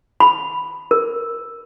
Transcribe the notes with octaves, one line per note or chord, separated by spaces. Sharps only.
B5
A#4